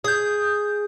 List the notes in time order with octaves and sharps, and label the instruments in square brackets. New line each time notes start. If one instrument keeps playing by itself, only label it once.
[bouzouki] G#4 [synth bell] D#6 G6